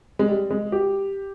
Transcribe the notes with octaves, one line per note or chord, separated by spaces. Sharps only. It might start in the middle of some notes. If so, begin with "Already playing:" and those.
G#3
G3
G#3
G4